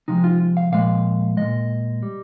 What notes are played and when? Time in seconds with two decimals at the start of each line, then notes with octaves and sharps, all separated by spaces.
0.08 C3 F3 G#3 D#4
0.24 F4
0.57 F5
0.72 A#2 F3 G#3 F5
1.37 A#2 F3 G#3 D#5
2.03 G3